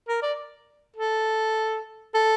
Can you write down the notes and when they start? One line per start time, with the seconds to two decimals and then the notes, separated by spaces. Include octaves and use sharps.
0.08 A#4
0.23 D5
0.96 A4
2.14 A4